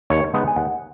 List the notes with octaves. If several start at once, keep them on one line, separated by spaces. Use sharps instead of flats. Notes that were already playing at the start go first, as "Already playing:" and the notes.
D#2 C#5
C#3 G#3 B3 D#4
G#5
D#2 F#5